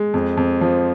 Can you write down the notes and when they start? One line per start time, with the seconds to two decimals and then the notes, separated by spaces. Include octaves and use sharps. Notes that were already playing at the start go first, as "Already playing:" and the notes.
Already playing: G#3
0.14 F2
0.37 F2
0.61 F3